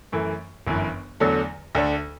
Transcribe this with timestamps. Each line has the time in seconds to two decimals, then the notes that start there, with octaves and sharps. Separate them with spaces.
0.12 F#2 E3 A3
0.67 G1 F#2 E3
1.20 E2 D3 F#3 A3 D4
1.75 D2 D3 A3 D4